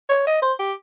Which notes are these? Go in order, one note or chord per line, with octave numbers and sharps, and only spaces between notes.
C#5
D#5
C5
G4